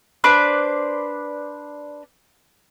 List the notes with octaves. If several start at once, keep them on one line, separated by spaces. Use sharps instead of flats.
D4 B4 C5 D5